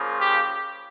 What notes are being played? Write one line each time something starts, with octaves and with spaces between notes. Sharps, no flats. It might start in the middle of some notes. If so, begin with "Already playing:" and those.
Already playing: C#3 F3 A#3
G4